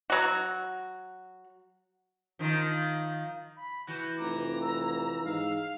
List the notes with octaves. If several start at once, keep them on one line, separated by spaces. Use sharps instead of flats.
F#3 F#4
D#3 F3
B5
E3 F#4 G6
F1 A#5 D6
E6
G#2 F5